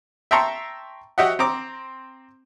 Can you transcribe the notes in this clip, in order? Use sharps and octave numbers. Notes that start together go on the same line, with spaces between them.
E5 G5 A5 A#5 C6 C#6
F#4 G4 D#5 E5 F#5
C4 A#5 D6